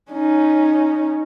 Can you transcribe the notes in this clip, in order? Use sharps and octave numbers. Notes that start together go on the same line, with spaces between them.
C#4 D#4